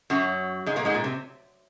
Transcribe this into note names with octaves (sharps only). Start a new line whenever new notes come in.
F#2 F#3
G#2 G#3
A#2 A#3
G#2 G#3
A#2
C3